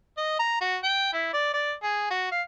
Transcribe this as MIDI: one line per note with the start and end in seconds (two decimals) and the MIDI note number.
0.17 0.38 75
0.39 0.60 82
0.61 0.77 66
0.83 1.11 79
1.13 1.32 64
1.33 1.52 74
1.53 1.73 74
1.83 2.09 68
2.10 2.29 66
2.31 2.42 77